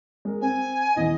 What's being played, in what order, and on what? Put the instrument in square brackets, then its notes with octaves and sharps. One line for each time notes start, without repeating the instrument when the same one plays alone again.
[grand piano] G#3 A#4
[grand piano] C4 [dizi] G#5
[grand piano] D#1 E3 B3 [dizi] D#5